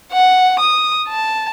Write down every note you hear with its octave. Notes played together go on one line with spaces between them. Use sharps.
F#5
D#6
A5